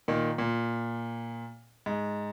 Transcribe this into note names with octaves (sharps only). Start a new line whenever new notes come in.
A#2 D#3
A#2
G#2